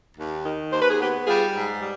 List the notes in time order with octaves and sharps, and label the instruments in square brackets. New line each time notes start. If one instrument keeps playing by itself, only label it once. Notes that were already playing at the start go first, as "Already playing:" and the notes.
[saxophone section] D#2
D#3
D#2 C5
B4
G#4
B3 G4 B4
G3 F4 G#4
G#2
G3